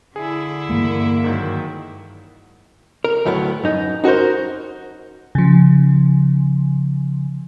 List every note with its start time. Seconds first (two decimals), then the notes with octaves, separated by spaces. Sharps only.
0.16 D3 E4 G#4
0.69 G2 E3 G#3 A#3
1.24 G#2 D#3 F#3
3.04 A#4
3.25 D2 A2 F#3 B3 F5
3.63 F#2 D#4
4.04 D#4 F#4 A4 A#4 C5
5.35 C#3 F3